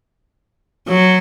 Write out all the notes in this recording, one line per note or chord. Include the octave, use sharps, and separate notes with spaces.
F#3